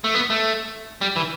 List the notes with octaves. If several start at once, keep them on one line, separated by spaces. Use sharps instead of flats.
A3
B3
A3
G3
E3